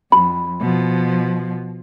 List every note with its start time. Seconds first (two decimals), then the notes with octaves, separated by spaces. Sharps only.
0.12 F2 B5
0.60 B2 F3